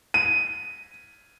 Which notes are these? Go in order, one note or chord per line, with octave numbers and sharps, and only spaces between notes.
D#7